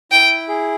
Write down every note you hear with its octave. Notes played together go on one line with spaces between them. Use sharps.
E4 G5
G#4